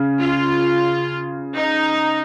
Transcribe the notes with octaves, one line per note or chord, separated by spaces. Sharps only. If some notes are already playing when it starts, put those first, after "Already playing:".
Already playing: C#3
F4
D#4